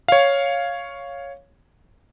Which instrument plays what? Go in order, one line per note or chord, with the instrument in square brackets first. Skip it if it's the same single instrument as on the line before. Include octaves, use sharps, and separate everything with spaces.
[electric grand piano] C#5 F5